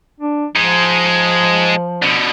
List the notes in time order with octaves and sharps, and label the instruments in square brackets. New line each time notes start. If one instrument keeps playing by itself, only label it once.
[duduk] D4
[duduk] F3 [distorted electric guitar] G#3 D#4
[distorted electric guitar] B2 D3